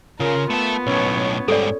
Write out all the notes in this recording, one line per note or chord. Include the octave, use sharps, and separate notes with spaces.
C#3 F4 A#4
A3 B3 A5
B1 A2 C#4 C#5
G#2 G3 A4 D5